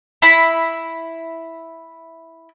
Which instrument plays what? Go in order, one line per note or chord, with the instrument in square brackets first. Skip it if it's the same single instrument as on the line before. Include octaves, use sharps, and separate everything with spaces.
[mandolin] E4 B5